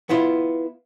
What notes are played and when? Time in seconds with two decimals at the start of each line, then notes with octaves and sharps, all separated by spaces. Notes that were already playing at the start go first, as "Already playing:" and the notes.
0.09 B3 E4 F4